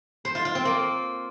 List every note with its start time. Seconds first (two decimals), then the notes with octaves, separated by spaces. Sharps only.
0.25 C5
0.35 F4
0.45 F4
0.55 C4
0.65 A#3